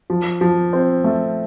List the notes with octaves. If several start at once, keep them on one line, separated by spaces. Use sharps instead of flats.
F3
F3
C4
A3